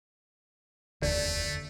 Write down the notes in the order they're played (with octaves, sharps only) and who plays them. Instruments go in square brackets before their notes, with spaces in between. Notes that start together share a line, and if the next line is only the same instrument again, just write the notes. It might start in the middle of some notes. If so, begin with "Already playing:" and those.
[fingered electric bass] F1 D#2 D3 [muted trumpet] A3 [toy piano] D5